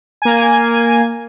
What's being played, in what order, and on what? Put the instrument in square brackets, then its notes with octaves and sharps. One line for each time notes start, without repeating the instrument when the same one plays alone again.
[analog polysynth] A#3 G#5